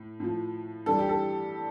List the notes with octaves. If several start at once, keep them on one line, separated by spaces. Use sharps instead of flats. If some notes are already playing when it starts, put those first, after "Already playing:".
Already playing: A2
A2 F3
G2 E3 G3 A4
G4
A4